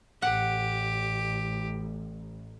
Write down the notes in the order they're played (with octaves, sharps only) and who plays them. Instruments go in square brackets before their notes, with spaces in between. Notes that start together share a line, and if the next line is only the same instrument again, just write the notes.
[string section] A1 [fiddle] G4 [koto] F#5